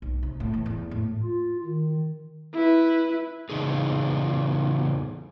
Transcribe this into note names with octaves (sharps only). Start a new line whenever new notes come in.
B1
C3
A2
E3
E2
A2
F4
D#3
E4 B4
E2 C#3 D#4 G#4